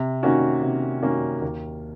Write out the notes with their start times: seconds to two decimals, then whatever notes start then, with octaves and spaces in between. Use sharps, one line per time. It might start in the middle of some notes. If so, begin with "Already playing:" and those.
Already playing: C3
0.23 D#3 A#3 C#4 F#4
0.63 C3
1.03 D#3 A#3 C#4 F#4
1.42 D#2